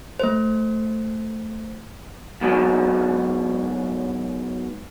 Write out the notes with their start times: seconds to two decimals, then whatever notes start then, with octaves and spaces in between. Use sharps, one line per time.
0.20 A3 C5
2.41 G#2 B2 F#3